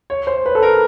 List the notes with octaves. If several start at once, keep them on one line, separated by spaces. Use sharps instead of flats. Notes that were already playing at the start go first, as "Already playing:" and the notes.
C#5
C5
B4
A4
A#4